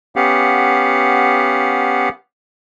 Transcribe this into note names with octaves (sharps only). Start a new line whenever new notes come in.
B3 C#4 G4 F5 F#5